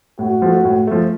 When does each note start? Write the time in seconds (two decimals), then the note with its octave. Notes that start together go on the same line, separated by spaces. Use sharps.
0.19 A2 F#4
0.42 F3 A3
0.65 A2
0.87 F3 A3